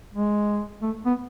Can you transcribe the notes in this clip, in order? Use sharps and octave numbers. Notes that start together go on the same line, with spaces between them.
G#3
A3
B3